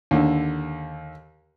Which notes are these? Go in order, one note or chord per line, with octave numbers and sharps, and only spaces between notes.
D#2 D3